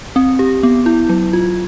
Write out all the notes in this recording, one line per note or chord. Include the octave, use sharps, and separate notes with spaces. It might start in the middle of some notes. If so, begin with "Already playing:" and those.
C4
G4
B3
E4
F#3
F4